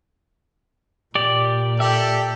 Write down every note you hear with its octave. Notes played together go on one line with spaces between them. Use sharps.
A#2 G4 D5 D6
G4 A4 D5 E5